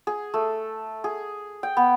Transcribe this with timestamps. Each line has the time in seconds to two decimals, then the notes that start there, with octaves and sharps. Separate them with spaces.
0.07 G#4
0.34 A3
1.04 G#4
1.63 G5
1.77 B3